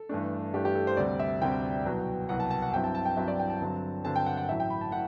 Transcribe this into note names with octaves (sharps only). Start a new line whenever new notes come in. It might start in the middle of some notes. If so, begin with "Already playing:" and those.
Already playing: A4
G2 E3 A3 D4
G2 E3 A3 D4 G4
G4
A4
C5
D2 C3 G3 C4 D5
E5
D2 C3 G3 C4 G5
C2 B2 F#3
C2 B2 F#3 F#5
A5
A5
F#5
G2 F#3 C4 E4 G5
A5
A5
G5
G2 F#3 C4 E4 E5
D5
G5
A5
G2 D3 F#3 C4
G2 D3 F#3 C4 A5
G5
F#5
F#5
A1 A2 F#3 E5
G5
B5
A5
A2 F#5